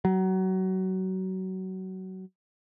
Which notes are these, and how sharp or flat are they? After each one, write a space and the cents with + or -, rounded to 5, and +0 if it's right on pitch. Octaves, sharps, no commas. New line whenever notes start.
F#3 +25